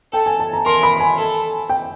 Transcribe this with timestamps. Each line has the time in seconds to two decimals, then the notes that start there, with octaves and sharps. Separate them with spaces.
0.13 A4 G5
0.26 G#5
0.39 A5
0.53 A#5
0.66 A#4 C6
0.83 B5
1.00 G#5
1.18 A4
1.70 G5